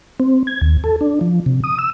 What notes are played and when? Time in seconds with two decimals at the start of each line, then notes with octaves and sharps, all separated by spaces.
0.20 C4
0.47 G#6
0.62 D#2
0.84 A4
1.01 D4
1.21 F3
1.46 C3
1.64 D#6
1.79 E6